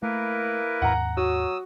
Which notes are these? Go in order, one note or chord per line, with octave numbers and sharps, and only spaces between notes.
A3 A#3 E4 A#4 B4
D#2 G#2 F#5 A#5
F#3 F#4 D#6 E6